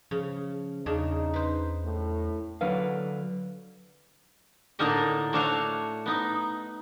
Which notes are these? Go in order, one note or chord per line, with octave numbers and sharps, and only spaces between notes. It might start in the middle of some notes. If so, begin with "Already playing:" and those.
C#3 F3
E2 C#3 D4 D#4
B4 C5
A2
D3 F#3 B4 F5
A2 D3 A#3 D#4 A#4 D#5
A3 D4 F#4 C#5 F5
B3 D#4